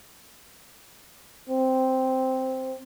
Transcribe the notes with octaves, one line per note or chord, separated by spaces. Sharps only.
C4